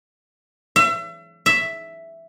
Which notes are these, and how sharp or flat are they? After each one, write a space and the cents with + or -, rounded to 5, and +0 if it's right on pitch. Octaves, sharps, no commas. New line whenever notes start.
E5 +35
E5 +5